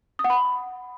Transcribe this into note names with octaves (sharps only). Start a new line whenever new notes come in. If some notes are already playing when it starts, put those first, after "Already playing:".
D#6
F#5
B5